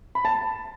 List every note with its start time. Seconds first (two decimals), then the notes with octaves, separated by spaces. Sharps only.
0.15 B5
0.25 A5